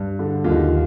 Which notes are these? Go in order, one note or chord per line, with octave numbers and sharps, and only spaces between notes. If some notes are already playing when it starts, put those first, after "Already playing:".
Already playing: G2
D3
D#2 F4
D#4
F4